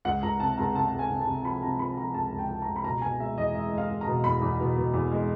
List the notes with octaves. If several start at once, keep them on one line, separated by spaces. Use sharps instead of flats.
C#2 F#5
C#2 A#5
C3 A5
C#2 A#5
C3 A5
C#2
G#5
C3
A5
C3
F3 B5
C3 A#5
F3 B5
F3 A#5
C#2 A5
C#2
G5
F3
A#5
C#2
B5
B2 A#5
B2 G#5
G#3 E5
E2 D#5
G#3 E5
G#3
F5
G#3
A#5
B2
E2 B5
E2
B2
B2
E2
G#3